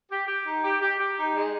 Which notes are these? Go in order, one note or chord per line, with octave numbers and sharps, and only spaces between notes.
G4
G4
D#4
G4
G4
G4
D#4
G#3